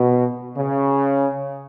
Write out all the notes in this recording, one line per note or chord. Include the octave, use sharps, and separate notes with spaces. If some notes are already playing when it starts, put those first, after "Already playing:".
Already playing: B2
C#3